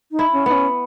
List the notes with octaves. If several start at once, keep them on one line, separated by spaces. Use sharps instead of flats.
D#4
E4
C#4
B3 D#4
C#4